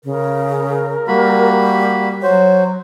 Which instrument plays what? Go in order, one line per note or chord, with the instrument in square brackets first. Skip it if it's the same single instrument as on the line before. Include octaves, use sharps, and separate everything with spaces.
[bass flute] C#3 [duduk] A#4
[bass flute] G3 [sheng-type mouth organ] A#3 F#4 B5
[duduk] F#3 [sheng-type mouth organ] F#4 C5 [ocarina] C#5